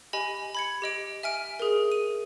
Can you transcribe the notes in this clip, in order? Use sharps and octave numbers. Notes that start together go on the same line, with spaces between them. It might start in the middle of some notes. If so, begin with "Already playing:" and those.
G4 D#5 G#5 B5
B5 G#6 C#7
G4 D#5 D7
E5 G#5 F6 D7
G#4 A#4
D#7